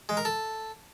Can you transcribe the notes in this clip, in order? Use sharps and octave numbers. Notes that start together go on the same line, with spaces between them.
G#3
A#4
A4